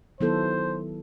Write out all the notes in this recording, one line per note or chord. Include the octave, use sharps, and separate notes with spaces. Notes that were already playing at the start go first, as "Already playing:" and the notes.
D#3 F#3 B3 E4 A4 C5